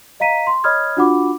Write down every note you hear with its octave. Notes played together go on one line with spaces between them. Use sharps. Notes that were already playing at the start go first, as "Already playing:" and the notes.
D#5 F5 A#5 B6 D#7
C6
C#5 D#5 B5 D#6 F6 G#6
D4 F4 F#4 F#5 B5 D6